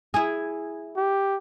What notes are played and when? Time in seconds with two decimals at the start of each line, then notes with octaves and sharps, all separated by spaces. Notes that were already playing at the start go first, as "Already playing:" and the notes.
0.14 E4 G#4
0.97 G4